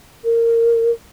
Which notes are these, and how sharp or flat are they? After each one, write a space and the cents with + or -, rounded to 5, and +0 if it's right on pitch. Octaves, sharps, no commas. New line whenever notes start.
A#4 -15